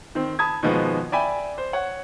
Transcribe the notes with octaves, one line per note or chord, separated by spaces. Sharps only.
D#3 C4
A5 B5 D#6 G#6
B2 D#3 F3 G#3 B3
D5 E5 G5 G#5 B5
C5
C#5 F#5